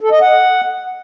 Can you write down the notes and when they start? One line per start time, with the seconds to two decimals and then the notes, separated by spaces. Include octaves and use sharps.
0.01 A4
0.11 D#5
0.21 F#5